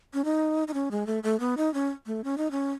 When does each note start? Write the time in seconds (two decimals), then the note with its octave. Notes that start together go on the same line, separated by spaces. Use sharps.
0.14 C#4
0.25 D#4
0.68 D#4
0.74 C#4
0.91 G#3
1.07 A3
1.23 A3
1.40 B3
1.57 D#4
1.74 C#4
2.06 A3
2.24 C#4
2.38 D#4
2.51 C#4